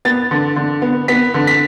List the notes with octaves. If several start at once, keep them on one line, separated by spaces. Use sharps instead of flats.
B3 A6
D3
D3
B3
B3 B6
D3
B6